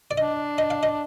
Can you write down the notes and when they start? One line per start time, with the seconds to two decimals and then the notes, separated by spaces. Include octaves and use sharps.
0.11 D5
0.18 D4 D#5
0.58 D#5
0.70 F5
0.83 D#5